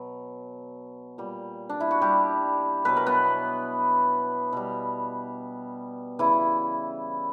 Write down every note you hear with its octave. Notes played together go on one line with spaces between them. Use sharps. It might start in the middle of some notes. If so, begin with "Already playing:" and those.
Already playing: B2 F#3
A#2 G3
D4
E4
F#4
G3 G4
B2 F#3 B4
A#4
B3 B4
B2 G3
C#3 E3 G3 E4